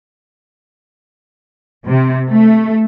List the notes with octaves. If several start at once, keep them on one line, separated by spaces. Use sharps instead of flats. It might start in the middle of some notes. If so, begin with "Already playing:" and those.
C3
A3